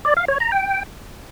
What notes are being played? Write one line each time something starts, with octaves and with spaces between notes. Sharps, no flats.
D5
F5
C#5
A#5
G5